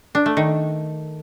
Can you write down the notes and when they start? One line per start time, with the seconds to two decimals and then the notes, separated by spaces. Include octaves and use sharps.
0.15 D4
0.26 A3
0.37 D#3